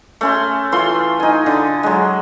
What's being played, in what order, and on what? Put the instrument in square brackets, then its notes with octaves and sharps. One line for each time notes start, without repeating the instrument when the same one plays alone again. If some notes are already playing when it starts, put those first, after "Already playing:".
[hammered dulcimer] A3 C#4 C6
E3 A3 F4 C6
D#4 G#5
D3
F#3 G#3